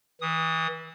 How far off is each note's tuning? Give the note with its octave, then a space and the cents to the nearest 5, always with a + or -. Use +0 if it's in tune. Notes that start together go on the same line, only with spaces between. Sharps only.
E3 -25 D#6 +0